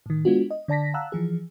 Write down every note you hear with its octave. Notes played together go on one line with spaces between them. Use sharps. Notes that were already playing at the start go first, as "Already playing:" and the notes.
A2 D#3
G#3 B3 D4 F4 F#4
D#5
D3 D5 A5 A#6 B6
F5 F#5 A5 A#5 E6 F#6
E3 F3 G#4